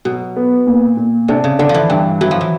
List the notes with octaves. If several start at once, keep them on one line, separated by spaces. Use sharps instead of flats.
B2 F#3
B3
A#2
A#2
C3 D4
C#3
D3 D4
F3
E3
G2 E3
E3 F#3
F3
E3